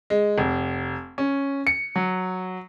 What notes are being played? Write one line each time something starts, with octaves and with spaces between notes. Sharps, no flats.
G#3
F1
C#4
C#7
F#3